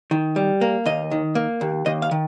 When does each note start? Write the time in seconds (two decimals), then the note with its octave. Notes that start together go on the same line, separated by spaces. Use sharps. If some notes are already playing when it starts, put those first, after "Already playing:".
0.11 D#3
0.36 G3
0.61 A#3
0.85 D#2 D#5
1.11 D#3
1.35 A#3
1.61 D#2
1.86 D#2 D#5
2.02 F5
2.11 D#3